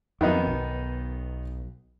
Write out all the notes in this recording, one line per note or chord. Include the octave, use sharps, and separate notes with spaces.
F2 D#3 F#3 B3 D#4
B1